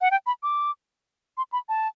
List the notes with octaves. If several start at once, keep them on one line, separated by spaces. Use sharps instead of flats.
F#5
G5
B5
D6
C6
B5
A5